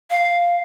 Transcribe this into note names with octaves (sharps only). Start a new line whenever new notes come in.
F5